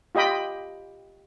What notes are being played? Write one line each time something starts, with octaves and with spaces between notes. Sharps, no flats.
F4 G4 D#5 G5 B5